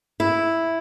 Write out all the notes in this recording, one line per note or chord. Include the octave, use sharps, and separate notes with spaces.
E4